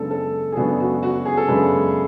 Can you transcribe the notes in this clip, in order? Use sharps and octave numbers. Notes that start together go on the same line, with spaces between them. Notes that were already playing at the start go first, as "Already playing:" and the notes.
Already playing: F#2 C#3 G#3 B3 D4 A4
A4
G#4
F#2 C#3 G#3 B3 D4 F#4
F#4
F#4
G#4
A4
F#2 C#3 G#3 B3 D4 B4